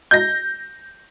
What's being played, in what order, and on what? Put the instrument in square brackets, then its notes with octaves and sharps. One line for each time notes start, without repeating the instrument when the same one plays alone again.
[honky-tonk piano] G6 A#6